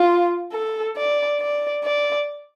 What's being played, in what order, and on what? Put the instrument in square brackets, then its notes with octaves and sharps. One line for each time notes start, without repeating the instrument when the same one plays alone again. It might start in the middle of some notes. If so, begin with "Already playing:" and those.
Already playing: [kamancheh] F4
A4
D5
D5
D5